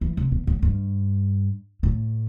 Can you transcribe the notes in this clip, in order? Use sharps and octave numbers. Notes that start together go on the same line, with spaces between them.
E3
C3
B2
A2
G2
A2